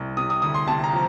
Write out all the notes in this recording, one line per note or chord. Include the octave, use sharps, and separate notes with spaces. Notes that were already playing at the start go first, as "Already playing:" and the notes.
Already playing: C2
C3 D#6
D#6
D2 D#6
C6
C3 A5
A#5
F3